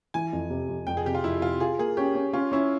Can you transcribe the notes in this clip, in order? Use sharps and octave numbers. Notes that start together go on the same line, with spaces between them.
E3 G#5
F2
C3
F2
F2 G5
G#4
C3 G4
F4
F2 E4
C3 F4
F4 G#4
A#3 G#4
C#4 G4
C#4
C#4 F4
C#4 E4